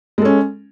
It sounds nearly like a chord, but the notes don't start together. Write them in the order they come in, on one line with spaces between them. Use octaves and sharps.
G#3 A4 C#4